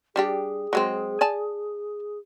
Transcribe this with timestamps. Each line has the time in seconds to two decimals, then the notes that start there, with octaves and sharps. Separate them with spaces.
0.16 G3 D4 G4 G#4
0.73 F#3 G#3 C4
1.21 D5 G#5 A5